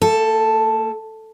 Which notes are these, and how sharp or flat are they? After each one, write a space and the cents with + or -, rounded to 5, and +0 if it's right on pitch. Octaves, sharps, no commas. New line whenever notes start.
A#3 -40 A4 +0